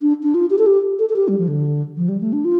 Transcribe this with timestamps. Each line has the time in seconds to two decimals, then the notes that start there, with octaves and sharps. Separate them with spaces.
0.02 D4
0.23 D4
0.34 F4
0.50 G4
0.59 A4
0.67 G4
0.99 A4
1.09 A4
1.16 G4
1.28 G3
1.38 F3
1.48 D3
1.97 F3
2.09 G3
2.21 A3
2.33 D4
2.45 F4